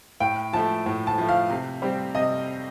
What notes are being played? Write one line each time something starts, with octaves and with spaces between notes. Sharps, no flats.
A2 G5
F3 A3 A5
A2
A5
F3 A3
F5
C3
G3 C4
C3 D#5